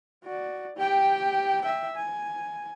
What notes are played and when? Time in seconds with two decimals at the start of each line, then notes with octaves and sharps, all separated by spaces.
0.25 F#4 D5
0.77 G4 G5
1.62 E5 G5
1.96 G#5